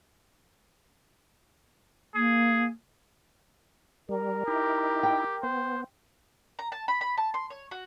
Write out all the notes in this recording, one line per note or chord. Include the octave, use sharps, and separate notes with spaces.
A#3 G#4
G3 A#4
D#4 E4 G4
G5
B3 C5
A#5
A5
B5
B5
A5
C6
C#5
F#4